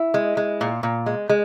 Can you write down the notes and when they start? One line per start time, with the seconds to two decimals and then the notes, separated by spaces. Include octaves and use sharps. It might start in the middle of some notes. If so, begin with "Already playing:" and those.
Already playing: E4
0.14 G#3
0.37 G#3
0.61 A#2
0.83 A#2
1.06 G#3
1.29 G#3